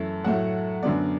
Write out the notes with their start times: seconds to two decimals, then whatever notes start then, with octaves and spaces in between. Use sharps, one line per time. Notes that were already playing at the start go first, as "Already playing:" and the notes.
Already playing: F#2 E3 A3 A5
0.24 A2 F#3 A3 F#5
0.83 F#2 D3 B3 D5